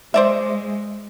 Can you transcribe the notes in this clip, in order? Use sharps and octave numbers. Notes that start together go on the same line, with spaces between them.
G#3 C5 D5 E5